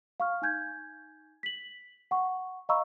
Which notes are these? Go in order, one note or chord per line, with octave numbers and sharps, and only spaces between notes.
F5 C#6 F6
D#4 G#5 G6 G#6
B6 F#7
F#5 C#6
D#5 F5 A#5 B5 C#6 E6